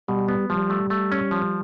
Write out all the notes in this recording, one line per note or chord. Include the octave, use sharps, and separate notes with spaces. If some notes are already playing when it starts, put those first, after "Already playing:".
B2 G3
B3
F3 G3
A3
A3
C#4
F3